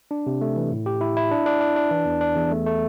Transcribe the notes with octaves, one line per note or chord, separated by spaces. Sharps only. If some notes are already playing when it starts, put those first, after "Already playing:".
D4
C3
A3
E3
A2
G4
E4
E4
D4
D4
D4
D4
E3
E2
D4
E2
A3
A3